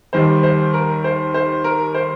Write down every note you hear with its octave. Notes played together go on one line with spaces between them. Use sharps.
D#2 D#3 G3 C5
C5
A#4
C5
C5
A#4
C5